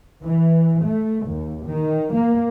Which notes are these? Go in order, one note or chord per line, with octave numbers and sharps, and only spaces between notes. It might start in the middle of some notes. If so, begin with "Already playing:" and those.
E3
A3
D#2
D#3
A#3